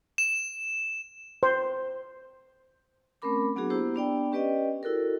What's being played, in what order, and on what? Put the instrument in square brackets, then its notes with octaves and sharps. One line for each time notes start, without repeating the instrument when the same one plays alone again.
[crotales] E7
[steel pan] C5
[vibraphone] A3 C4 C#4 A#4 B5 D6
F#3 B3 D4 F#4 G#4
A#3 B3 E4 G4 C5
B3 D4 D5 G5
C#4 G4 B4 D5 D#5 G5
E4 F#4 A4 A#4